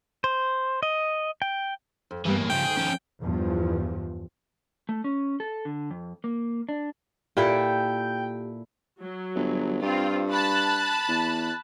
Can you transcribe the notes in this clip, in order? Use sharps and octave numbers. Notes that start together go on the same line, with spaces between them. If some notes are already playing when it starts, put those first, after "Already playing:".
C5
D#5
G5
F2
G2 E3 G3 A#3 B3
A2
C#3 F3 G5
D2 G#2 D#3 G#4
F3 C#4
E2 G2 F3
A3
C#4
A4
D3
F2
A#3
D4
A#2 E4 G4 A4 G5
F#3
G1
G2 C4 F4
A5 B5 F#6
E2